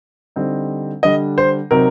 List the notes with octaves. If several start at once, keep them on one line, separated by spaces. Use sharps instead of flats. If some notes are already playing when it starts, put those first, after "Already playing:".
D3 G3 C4 D#4
D3 G3 D4 D#5
C5
C3 F#3 C4 D#4 A#4